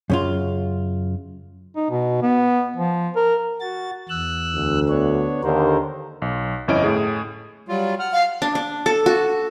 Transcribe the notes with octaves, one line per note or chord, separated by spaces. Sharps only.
F#2 C#3 F4
D#4
B2
B3
F3
A#4
F#4 A6
E2 E6 F#6
D2
B3 D4 C#5
D#2 D3 A#4 C5
B1
G1 F2 C#4 E4 D#5 D7
A2 G#4
F#3 G3 F4
F#5 F6
F5
D4
D4
A4
F#4